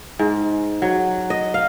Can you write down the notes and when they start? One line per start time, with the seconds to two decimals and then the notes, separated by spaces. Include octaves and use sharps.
0.19 G#2
0.82 F#3
1.30 D#5
1.54 F5